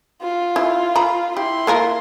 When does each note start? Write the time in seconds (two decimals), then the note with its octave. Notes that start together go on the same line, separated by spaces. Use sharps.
0.22 F4
0.56 E4
0.96 A#5 B5
1.37 E4 G4 C6
1.67 A#3 F4 A#4